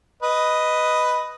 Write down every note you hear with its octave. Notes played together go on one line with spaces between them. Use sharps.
B4 D#5